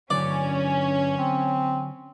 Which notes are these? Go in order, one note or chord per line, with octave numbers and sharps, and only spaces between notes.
G2 D3 F#3 C#4 D5
C4